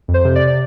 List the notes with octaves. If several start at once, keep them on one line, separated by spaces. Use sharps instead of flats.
F2
C5
C3
D5
D5